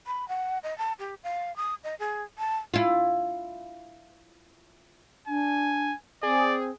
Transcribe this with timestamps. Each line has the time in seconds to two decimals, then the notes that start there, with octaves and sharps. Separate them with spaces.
0.07 B5
0.28 F#5
0.63 D#5
0.78 A5
0.99 G4
1.24 F5
1.56 D#6
1.84 D#5
1.99 G#4
2.38 A5
2.74 E4 F4
5.28 D4 G#5
6.23 C4 G#4 D5